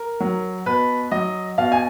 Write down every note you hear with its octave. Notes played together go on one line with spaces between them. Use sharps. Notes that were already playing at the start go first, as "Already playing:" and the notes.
Already playing: A#4
F#3
B2 B4
F#3 D#5
B2 F5
G#5